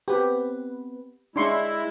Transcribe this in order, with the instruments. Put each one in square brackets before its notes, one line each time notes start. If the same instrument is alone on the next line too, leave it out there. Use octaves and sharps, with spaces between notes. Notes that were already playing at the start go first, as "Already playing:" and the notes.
[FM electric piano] B3 C4 B4 [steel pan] G4
[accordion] G#3 E4 [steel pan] D4 C6 C#6 [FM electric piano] C#5